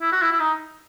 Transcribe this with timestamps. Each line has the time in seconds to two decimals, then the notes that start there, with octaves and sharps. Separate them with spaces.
0.02 E4
0.12 F#4
0.22 E4
0.32 E4
0.40 D#4